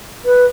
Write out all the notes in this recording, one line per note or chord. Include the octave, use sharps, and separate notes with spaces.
B4